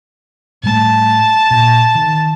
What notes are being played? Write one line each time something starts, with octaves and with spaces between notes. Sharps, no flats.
A2 G3 A3 A5
A#2
D#3